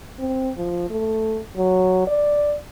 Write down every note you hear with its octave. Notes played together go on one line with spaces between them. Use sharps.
C4
F3
A3
F#3
D5